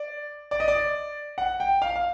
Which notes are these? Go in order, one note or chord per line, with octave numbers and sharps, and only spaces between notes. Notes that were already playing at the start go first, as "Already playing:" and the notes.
Already playing: D5
D5
D#5
D5
F#5
G5
F5
F5